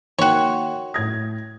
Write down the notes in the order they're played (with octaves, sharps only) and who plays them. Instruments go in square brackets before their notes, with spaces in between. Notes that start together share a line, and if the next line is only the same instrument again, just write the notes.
[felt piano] D#3 A#3 [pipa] F#4 C#5 [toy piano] G5 C6
[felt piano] A2 G#6 A#6 [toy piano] D#6